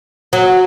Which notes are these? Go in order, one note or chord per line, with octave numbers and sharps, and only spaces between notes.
F#3